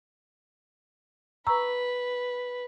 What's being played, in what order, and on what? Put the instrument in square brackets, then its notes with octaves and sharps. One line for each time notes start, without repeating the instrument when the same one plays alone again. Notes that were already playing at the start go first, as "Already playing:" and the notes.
[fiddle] B4 [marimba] A#5 C#6 E6